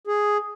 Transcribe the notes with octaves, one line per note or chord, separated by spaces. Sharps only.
G#4